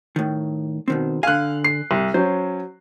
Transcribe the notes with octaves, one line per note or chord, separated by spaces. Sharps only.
A2 D#3
B2 D#3 C4
D3 F5 G#5 F#6
C7
C2
F#3 C#4 C5